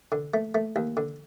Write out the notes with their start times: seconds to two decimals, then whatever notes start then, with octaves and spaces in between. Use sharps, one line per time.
0.12 D3
0.34 A3
0.55 A3
0.76 D#2
0.97 D3